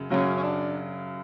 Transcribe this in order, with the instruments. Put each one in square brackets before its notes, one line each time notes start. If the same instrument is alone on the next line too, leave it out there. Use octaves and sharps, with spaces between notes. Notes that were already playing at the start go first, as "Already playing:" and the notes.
Already playing: [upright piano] F#2 C#3
[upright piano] F#2 C#3 F#3 [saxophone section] C#4
[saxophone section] C#4
D4